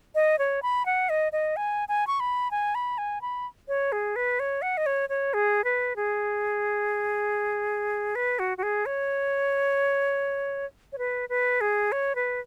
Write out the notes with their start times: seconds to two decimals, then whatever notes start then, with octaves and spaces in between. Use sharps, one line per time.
0.15 D#5
0.39 C#5
0.63 B5
0.86 F#5
1.09 D#5
1.32 D#5
1.56 G#5
1.89 G#5
2.07 C#6
2.20 B5
2.51 G#5
2.75 B5
2.98 G#5
3.22 B5
3.68 C#5
3.92 G#4
4.16 B4
4.40 C#5
4.62 F#5
4.77 D#5
4.86 C#5
5.09 C#5
5.34 G#4
5.64 B4
5.96 G#4
8.15 B4
8.39 F#4
8.58 F#4
8.63 G#4
8.86 C#5
10.93 C#5
10.98 B4
11.29 B4
11.61 G#4
11.92 C#5
12.15 B4